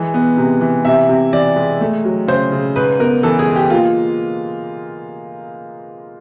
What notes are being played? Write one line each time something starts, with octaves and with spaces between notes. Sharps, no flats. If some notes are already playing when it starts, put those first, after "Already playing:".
Already playing: E3 G#3
B3
C3
E3
C3 E5
C3
E3 D5
G#3
A3
F#3
C#3 C5
C#3
G#2 B4
B3 A#4
E3 A4
G#4
G#3
G4
A#3 F4